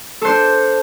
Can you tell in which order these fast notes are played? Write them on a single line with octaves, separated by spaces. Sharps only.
A4 C5 D4